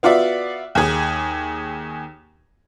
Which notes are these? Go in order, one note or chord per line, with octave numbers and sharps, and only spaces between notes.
B3 F4 F#4 D5 E5
D#2 G#4